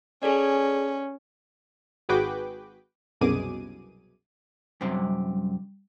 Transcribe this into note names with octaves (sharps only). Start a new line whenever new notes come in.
C#4 G#4 A4 D5
G#1 F#4 G#4 B4 G5 D6
C2 F#2 B2 G#4 D6 D#7
F#2 C3 G3 C4